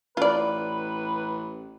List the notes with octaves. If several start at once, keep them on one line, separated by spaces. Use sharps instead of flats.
A1 F4 B4 D5